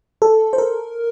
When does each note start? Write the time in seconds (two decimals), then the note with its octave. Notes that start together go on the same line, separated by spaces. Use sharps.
0.22 A4
0.53 C5
0.58 A#4